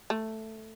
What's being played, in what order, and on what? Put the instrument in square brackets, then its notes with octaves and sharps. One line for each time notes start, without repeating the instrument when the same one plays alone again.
[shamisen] A3